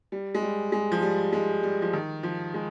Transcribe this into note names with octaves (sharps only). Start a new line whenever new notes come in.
G3
G#3
G3
G#3
F3
G3
G#3
G3
F3
D#3
F3
G#3